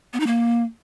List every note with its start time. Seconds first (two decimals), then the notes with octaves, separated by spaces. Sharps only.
0.13 B3
0.20 D#4
0.27 A#3